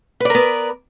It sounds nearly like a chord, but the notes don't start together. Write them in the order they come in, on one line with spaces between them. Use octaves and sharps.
B4 D5 A#4 B3